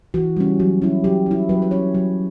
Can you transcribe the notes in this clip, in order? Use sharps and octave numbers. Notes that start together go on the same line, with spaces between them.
E3 F#4
G3 C#4
F#3
C#4 E4
F#3 G4
C#4 E4
F#3 B4
B4
C#4 E4 C#5
F#3